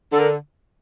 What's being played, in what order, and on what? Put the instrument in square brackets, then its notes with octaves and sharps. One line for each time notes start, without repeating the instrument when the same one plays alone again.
[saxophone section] D3 [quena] A4
[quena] A#4